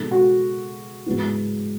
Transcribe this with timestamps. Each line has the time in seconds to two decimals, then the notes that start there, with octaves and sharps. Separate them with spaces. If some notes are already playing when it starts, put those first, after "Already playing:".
Already playing: B2 G#3 D#4 A4
0.11 F#4
1.06 G#2 F#3 B3 E4